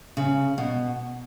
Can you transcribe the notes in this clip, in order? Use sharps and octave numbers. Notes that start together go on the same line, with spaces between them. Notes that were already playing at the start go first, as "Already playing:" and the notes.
C#3
B2